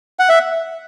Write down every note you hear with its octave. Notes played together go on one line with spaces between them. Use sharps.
F#5
E5